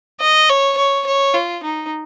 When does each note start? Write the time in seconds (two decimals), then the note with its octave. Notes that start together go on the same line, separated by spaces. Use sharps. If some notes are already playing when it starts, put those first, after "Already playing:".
0.21 D#5
0.50 C#5
0.78 C#5
1.07 C#5
1.34 F4
1.63 D#4